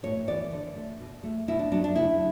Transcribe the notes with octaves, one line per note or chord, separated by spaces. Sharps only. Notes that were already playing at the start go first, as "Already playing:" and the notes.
A2 C#5
E3 B3 D5
D3
A3
B2
A3
B2 E4
D4
F#3 B3 D4
D4
C#3 E4